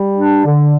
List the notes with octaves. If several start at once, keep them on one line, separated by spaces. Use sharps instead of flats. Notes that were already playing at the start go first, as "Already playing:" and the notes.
Already playing: G3
D4
D3